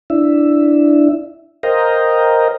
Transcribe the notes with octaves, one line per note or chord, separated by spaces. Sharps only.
D4 E4 E5
A#4 C5 D#5 F5 G5 A#5